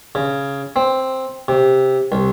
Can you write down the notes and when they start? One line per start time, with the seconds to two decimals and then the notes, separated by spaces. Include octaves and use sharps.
0.15 C#3
0.76 C4
1.48 C3
2.12 C2